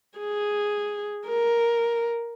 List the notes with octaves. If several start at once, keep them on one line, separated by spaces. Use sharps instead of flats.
G#4
A#4